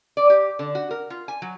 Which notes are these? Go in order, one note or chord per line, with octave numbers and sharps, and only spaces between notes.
D5
G4
D3
F#4
A#4
F4
G#5
F#3